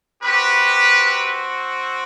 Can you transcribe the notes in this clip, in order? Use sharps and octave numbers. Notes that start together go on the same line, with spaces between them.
C4 F#4 G4 B4